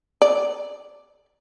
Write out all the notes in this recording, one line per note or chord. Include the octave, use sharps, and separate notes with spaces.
D5